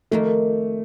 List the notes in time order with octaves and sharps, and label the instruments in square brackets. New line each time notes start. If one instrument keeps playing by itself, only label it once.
[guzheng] F2 D#3 A#3 [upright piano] A3